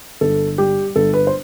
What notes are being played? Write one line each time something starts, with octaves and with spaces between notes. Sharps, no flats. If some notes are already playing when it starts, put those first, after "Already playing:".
G1 A4
G3 G4
G1 A4
B4
C5